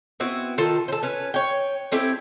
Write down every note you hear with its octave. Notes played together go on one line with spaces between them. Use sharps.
B3 C4 E4 F#4
D#3 F4 A4 A5
A4 C5
C#4 B4
C#5 G5
A3 C4 E4 G4